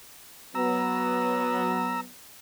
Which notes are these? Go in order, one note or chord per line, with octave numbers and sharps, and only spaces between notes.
F#3 B3 A#5 E6